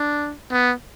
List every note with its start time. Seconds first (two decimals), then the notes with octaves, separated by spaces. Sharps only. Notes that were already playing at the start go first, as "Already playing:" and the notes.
Already playing: D4
0.52 B3